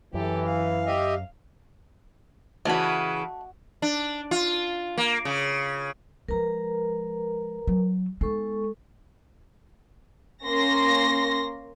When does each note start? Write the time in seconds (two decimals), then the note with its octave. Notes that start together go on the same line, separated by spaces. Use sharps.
0.14 F#2 E3 G4 A4
0.45 F5
0.86 G4 D#5 E5
2.65 C#3 E3 A3 F#4 B4 D5 D#5 B5
3.82 D4
4.31 F4
4.98 A#3
5.25 C#3
6.29 F3 G#3 A#4 B4 A#5
7.67 F#3
8.21 G#3 B3 D#4 A4 C#6
10.46 A#3 C#4 C6 A#6